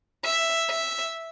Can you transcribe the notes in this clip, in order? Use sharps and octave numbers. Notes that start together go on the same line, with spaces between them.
E5
E5